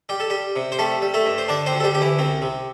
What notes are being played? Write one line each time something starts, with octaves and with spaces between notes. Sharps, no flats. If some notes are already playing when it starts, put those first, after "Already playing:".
G3 G4
A4
G3 G4
C3
C5
G3 A3 A4
G3
A3 A4
G2
C5
D3 D4 D5
C4 C5
D2
A4
G3 G4
D2 G4
E3 E4
C2 C4
C3